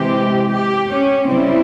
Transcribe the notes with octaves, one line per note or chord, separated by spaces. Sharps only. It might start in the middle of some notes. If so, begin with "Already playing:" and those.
Already playing: C3 E3 G#3 C4 G4
G4
C#4
C#3 G3 C4 E4